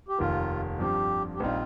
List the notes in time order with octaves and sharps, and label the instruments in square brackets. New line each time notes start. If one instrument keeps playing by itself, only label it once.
[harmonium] G4
[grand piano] F1 D#2 D#3 A#3 [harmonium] F4
[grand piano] G2 F3 C4 [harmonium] G4
[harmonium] G4
[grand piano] A#1 G3 C4 D#4 [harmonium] F4